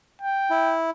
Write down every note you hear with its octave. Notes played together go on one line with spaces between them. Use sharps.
G5
E4